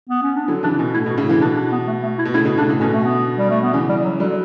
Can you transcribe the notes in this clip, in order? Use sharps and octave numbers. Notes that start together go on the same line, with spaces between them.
B3
C#4
D4
D3 F#3 E4
C#3 E3 D4
B2 C#4
A2 E4
B2 F#4
A2 C#3
C#3 E3 E4
B2 D4
D4
B3
A3
A3
E4
B2
A2 C#3 E4
B2
A2 C#3 D4
A2 C#3
B2 D3 C#4
A3
B3
G3
A3
B3
C#3 E3 C#4
G3
F#3
D3 F#3 G3